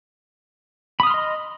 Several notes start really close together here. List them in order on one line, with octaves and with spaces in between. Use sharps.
B5 D#6 F6 C6 D#5